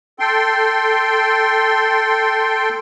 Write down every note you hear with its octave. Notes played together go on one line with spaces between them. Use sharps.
A4 G5 C6